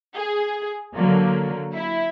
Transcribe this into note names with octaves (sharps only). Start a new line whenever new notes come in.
G#4
D3 F#3 A#3
E4